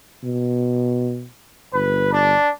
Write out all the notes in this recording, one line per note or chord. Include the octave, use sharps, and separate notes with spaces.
B2
G1 B4
D4